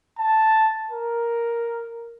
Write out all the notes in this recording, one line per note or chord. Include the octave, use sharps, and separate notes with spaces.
A5
A#4